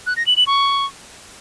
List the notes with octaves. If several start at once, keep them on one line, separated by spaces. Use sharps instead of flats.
F#6
A#6
F#7
F#7
C#6